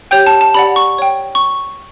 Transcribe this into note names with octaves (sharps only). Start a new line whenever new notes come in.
G4 C#5 G5 G6
A5
A5
G4 D5 F#5 B5
C#6
C#5 G5
C#6